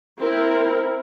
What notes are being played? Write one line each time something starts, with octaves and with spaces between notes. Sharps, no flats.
C4 E4 A#4